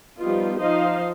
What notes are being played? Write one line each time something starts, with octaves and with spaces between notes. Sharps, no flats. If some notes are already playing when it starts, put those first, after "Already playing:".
F3 G3 B3 D#4 F4
F3 D#4 C5 D#5 F5